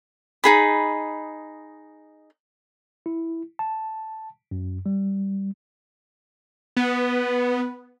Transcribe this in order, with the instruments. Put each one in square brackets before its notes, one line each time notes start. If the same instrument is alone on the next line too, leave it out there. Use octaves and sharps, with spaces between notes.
[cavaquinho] D#4 G#4 B5
[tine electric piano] E4
A5
F#2
G3
[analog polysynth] B3